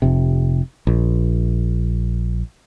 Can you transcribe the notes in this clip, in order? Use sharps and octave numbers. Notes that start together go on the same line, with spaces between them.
F1 C3
A#1